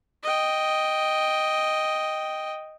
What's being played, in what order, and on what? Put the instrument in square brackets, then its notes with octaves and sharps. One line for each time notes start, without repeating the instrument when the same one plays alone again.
[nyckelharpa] D#5 G5